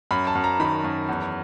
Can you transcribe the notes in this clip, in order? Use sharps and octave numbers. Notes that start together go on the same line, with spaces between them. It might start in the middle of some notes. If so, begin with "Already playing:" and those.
F#2 B5
A5
F#2
A#5
D#3 B5
F#2
E2